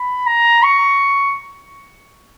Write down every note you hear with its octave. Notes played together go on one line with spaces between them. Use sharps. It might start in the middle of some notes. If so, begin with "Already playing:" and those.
Already playing: B5
A#5
C#6